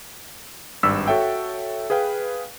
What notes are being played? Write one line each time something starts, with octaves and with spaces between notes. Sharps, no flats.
G#1 G2 E6 B6
F#4 A4 C#5 E5 G5
G#4 B4 F5 G5